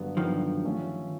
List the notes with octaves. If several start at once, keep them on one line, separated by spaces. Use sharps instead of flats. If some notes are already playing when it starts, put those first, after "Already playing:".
Already playing: G2 D3 F#3 B3
G2 D3 D#3 F3 F#3 B3
A3 C#4 F4